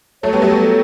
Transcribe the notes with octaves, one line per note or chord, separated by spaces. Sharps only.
F#3 A3 C#5
G3 B3
F#3 A3 G4
G3 B3
A4